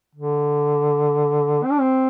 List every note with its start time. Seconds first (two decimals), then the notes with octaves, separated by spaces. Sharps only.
0.15 D3
1.64 C4
1.72 D4
1.80 C4